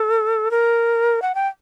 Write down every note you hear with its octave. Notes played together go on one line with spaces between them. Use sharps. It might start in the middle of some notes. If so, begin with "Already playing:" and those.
Already playing: A4
A#4
F#5
G5